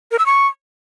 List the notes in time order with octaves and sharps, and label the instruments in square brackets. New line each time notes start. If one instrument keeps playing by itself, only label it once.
[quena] A#4
E6
C#6